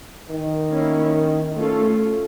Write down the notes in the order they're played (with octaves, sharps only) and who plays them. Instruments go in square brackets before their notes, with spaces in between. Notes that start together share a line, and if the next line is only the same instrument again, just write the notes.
[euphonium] D#3
[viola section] A#3 C#4 E4
A3 C#4 F4 A4